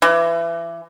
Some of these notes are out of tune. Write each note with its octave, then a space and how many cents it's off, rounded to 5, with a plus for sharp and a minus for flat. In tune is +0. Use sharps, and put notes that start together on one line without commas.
E3 +30